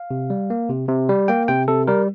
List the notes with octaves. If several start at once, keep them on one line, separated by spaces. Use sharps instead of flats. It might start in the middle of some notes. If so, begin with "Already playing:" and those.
Already playing: F5
C3
G3
A#3
C3
C3
G3
A#3 G5
C3 G5
C3 A4
G3 A#4